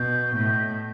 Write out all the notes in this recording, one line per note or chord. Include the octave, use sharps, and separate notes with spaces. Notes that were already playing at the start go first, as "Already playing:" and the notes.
Already playing: B2 G6
A2